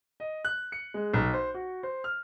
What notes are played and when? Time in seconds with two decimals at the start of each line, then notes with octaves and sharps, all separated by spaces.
0.20 D#5
0.45 F#6
0.72 C#7
0.94 G#3
1.13 B1
1.34 C5
1.54 F#4
1.83 C5
2.04 F6